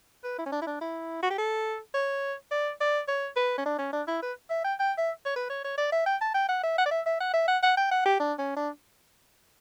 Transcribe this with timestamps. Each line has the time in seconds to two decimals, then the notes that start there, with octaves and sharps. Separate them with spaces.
0.24 B4
0.39 E4
0.46 C#4
0.52 D4
0.62 E4
0.67 D4
0.81 E4
1.23 F#4
1.31 G4
1.39 A4
1.94 C#5
2.51 D5
2.81 D5
3.08 C#5
3.36 B4
3.58 C#4
3.66 D4
3.79 C#4
3.93 D4
4.08 E4
4.22 B4
4.50 E5
4.64 G5
4.79 G5
4.98 E5
5.26 C#5
5.36 B4
5.50 C#5
5.64 C#5
5.78 D5
5.92 E5
6.07 G5
6.21 A5
6.34 G5
6.49 F#5
6.64 E5
6.78 F#5
6.86 D5
6.91 E5
7.06 E5
7.21 F#5
7.34 E5
7.48 F#5
7.63 F#5
7.77 G5
7.91 F#5
8.06 G4
8.20 D4
8.39 C#4
8.57 D4